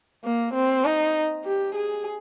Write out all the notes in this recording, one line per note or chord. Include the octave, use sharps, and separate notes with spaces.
A#3
C4
D#4
G4
G#4